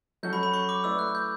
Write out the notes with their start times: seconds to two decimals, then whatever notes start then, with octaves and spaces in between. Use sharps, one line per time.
0.23 F#3 C#4 F#4 A4 G6
0.33 B5
0.43 B5
0.54 C#6
0.69 D6
0.84 A3 E4 B4 D5 E6
0.99 F#6
1.15 G6